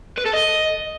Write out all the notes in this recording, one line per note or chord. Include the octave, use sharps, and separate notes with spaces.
B4
A4
D#5